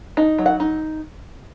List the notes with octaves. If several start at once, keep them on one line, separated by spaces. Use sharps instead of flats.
D#4
F#3
F#5
D#4